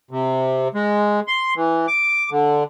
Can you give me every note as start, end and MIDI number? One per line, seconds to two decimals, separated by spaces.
0.11 0.68 48
0.74 1.20 56
1.28 1.54 84
1.56 1.87 52
1.88 2.30 86
2.31 2.64 50